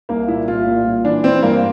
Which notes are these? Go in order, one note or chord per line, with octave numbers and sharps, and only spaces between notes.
C2 A#3
A#2 E4
C2 F4
A#2
A#2
E3 D4
E3 C4
G2 A#3